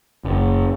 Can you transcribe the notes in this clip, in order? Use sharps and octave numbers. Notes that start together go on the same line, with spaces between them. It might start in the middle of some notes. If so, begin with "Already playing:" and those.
F#1